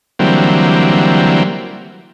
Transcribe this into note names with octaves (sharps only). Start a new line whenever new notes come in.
D3 E3 F#3 G3 A#3 C4